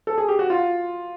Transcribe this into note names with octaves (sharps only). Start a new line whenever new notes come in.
A4
G#4
G4
F#4
F4